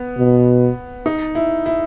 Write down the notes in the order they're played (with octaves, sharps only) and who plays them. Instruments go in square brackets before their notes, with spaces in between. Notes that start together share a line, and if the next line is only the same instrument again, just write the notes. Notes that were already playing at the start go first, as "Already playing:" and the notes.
Already playing: [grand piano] B3
[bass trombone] B2
[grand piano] D#4
E4
E4